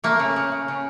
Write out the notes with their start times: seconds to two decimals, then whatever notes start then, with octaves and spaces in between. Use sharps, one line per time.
0.04 A3 A#3
0.19 C#3
0.36 C#3
0.52 C#3
0.68 C#3